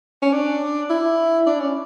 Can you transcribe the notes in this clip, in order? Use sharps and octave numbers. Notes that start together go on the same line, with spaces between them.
C#4
D4
E4
D4
C#4